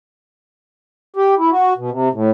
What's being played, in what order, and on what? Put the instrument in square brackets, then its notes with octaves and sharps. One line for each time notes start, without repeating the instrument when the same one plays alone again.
[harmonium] G4
E4
F#4
B2
C3
A2